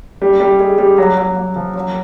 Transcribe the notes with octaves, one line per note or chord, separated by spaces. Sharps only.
G3
G3
G#3
G3
F#3
F#3
F#3
F3
F#3